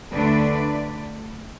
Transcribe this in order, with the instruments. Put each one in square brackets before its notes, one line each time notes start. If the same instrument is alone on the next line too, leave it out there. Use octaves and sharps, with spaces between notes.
[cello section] D2 D3 A3 D4 B4 D5